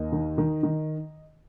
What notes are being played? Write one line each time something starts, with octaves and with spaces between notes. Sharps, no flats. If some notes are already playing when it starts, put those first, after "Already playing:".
Already playing: D#2 D#5
D#3
D#3
D#3